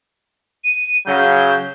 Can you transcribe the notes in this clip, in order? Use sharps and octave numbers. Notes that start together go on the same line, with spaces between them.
D#7
C#3 F#3 G6